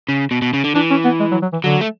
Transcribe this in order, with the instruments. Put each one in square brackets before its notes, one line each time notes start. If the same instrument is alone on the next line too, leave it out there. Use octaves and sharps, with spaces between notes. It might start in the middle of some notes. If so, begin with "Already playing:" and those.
[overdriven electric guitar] C#3
B2
B2
C#3
D3
[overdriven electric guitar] E3 [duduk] D4
[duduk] C#4
B3
G#3
F#3
F#3
E3
[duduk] D3 [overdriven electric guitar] F#3
[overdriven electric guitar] A3